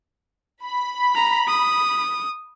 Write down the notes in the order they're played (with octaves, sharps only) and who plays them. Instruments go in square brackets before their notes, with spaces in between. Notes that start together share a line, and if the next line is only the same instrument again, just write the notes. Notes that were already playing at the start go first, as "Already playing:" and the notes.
[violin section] B5
[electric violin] A#5
D#6